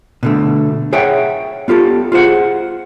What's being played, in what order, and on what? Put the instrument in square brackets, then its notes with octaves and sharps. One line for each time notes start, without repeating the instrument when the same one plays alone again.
[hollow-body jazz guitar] B2 D3 A3
G#4 C#5 E5 F#5 G5
B3 F4 G4 A4
F4 G#4 C5 F#5